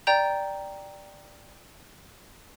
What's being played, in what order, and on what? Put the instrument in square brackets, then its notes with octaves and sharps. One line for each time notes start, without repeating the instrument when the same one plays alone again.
[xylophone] D5 G5 A#5 G6